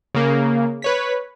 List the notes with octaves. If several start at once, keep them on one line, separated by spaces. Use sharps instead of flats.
C#3 A#3
B4 C#5 B6